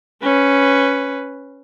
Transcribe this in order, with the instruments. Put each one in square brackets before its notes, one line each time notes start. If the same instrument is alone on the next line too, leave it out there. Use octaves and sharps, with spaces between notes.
[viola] C#4 B4